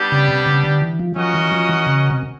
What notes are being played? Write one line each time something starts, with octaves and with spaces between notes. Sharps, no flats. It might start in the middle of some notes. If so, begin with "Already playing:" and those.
Already playing: G3 B3 D4 G4
C#3
C3
C#3
D3
E3
F3
F3 C#4 F#4 A#4 D#5 F#5
E3
F3
E3
C#3
C3